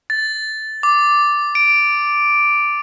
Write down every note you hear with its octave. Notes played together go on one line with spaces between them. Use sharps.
A6
D6
D7